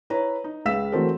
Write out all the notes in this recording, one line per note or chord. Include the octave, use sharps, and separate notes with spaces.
E4 B4 C#5 A#5
D#4
C#2 B4 F5 E6 B6 E7
E3 F#3 A3 C4 A4 A#4